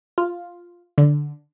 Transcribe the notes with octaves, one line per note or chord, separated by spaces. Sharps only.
F4
D3